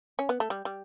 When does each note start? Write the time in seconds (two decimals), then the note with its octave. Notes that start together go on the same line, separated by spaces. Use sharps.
0.19 C#4
0.29 B3
0.40 A3
0.50 G3
0.65 G3